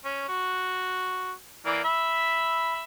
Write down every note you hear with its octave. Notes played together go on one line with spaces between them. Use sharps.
C#4
F#4
E3 A#3 D5
E5 B5